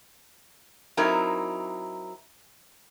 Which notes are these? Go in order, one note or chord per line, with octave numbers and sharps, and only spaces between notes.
F#3 C4 D#4 E4 A#4